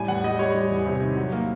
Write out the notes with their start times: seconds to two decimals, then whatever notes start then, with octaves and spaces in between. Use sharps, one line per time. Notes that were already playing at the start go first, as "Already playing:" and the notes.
Already playing: A2 G3 G#5
0.08 E2 F#5
0.24 G3 D#5
0.39 G3 C#5
0.55 G3
0.70 E2
0.86 C3
1.02 D#3
1.17 F#3
1.33 A#3